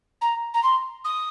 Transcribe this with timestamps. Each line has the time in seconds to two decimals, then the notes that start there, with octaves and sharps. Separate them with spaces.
0.21 A#5
0.54 A#5
0.63 C6
1.04 D#6